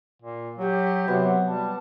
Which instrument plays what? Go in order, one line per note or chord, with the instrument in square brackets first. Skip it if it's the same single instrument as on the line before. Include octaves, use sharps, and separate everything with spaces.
[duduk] A#2
[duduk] F#3 [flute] G4
[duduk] C3 [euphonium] F#3 [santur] B3
[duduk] G3 [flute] A5